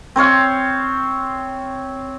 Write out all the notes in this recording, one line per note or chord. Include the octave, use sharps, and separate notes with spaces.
C4 C5 C#5 F5